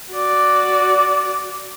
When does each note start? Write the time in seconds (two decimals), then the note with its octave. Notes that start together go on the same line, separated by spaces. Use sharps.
0.12 F#4 D5